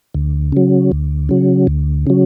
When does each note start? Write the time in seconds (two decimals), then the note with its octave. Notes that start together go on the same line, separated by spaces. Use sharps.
0.15 D2
0.52 C#3 F#3
0.92 D2
1.29 C#3 F#3
1.67 D2
2.07 C#3 F#3